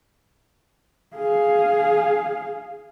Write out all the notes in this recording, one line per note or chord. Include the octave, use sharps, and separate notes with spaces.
G#4 F5